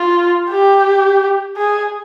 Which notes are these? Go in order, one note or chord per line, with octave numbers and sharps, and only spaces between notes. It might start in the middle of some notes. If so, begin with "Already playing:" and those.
Already playing: F4
G4
G#4